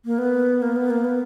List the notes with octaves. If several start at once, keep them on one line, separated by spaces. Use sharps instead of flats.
A#3
B3
A#3
B3
A#3
B3